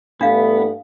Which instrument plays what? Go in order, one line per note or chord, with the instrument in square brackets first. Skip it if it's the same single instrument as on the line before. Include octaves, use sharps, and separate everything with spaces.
[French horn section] G2 E3 A3 [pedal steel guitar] B3 [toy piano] D4 F5